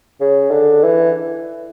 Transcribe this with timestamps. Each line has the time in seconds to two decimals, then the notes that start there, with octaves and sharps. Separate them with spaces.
0.21 C#3
0.51 D3
0.83 E3